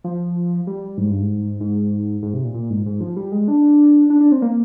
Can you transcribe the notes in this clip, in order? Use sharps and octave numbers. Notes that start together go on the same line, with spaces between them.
F3
G3
G#2
G2
G#2
G#2
G#2
C3
A#2
A#2
G#2
G#2
F3
G3
G#3
D4
D4
D4
C4
A#3